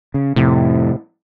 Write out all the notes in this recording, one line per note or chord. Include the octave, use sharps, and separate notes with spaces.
C#3
F2 A2 C3